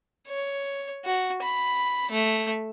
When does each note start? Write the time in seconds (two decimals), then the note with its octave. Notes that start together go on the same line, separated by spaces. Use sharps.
0.27 C#5
1.05 F#4
1.42 B5
2.11 A3